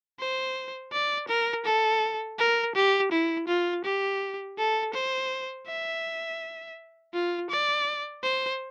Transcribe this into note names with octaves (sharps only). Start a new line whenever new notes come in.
C5
D5
A#4
A4
A#4
G4
E4
F4
G4
A4
C5
E5
F4
D5
C5